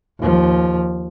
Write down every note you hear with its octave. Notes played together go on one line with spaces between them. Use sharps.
D#2 F3